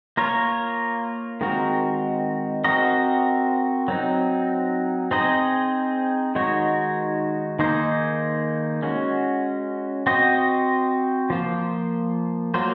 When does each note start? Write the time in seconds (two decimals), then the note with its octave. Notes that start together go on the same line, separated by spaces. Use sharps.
0.17 A#3 F4 A#4 C#5
1.41 D#3 G#3 C4 F#4 A#4
2.64 C4 F#4 A#4 D#5
3.88 F#3 C4 D#4
5.11 C4 D#4 G#4 C5 D#5
6.35 D#3 G#3 D#4 F#4 C#5
7.59 D#3 A#3 D#4 G#4 C5
8.82 G#3 C#4 F#4
10.07 C4 F#4 C5 D#5
11.30 F3 A#3 F4 C5
12.54 F#3 A#3 F4 C5